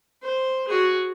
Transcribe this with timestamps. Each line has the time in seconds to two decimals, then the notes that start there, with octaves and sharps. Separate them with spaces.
0.22 C5
0.68 F#4 G#4